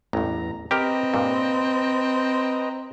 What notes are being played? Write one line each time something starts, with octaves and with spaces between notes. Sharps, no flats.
A1 E2 G2 A#5
C4 G4 A#4 B4 D#5 A#5
G2 A#2